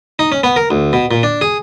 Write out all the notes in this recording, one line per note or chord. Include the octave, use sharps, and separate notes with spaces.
D#4
C#4
B3
A#4
D2
B2
A#2
D4
G#4